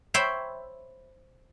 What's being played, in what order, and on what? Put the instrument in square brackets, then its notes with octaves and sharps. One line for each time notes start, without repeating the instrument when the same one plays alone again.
[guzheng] C5 C#5 E5 G5 B5